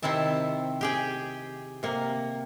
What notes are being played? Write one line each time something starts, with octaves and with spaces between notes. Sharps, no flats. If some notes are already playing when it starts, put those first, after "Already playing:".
C3 D#3 C4 E4 A5
G4 G#4 G5
C3 A#3